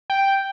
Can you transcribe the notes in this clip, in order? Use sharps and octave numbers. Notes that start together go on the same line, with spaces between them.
G5